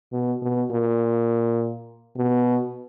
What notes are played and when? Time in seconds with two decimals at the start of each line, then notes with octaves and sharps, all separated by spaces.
0.12 B2
0.42 B2
0.71 A#2
2.17 B2